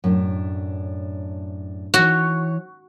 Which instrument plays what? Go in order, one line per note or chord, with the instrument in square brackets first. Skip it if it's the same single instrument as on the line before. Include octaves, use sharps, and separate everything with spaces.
[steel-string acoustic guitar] F#2 A2 D4
[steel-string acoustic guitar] E3 C#5 [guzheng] F#4